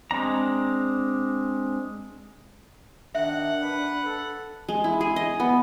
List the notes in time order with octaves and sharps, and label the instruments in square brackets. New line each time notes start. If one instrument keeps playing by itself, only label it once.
[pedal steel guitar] G#3 C4 D4 A#5
[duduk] D#3 [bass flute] D4 [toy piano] E5 [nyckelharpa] F#5
[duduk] B4
A4
[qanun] G#3
E4
G#4
D#5
B3